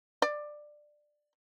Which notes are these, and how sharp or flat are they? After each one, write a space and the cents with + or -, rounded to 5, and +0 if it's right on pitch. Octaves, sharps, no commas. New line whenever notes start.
D5 +15